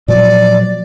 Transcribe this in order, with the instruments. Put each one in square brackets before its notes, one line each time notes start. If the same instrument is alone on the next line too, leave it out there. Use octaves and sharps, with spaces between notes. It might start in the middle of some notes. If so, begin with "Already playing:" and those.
[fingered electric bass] A#2 F3 F#3 [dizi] D5